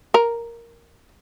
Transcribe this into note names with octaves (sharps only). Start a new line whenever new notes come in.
A#4